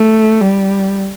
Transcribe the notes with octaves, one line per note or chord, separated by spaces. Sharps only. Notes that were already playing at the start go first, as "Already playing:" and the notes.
Already playing: A3
G3